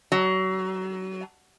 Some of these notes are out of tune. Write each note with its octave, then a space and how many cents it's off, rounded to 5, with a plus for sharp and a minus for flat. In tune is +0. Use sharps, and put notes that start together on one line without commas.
F#3 +30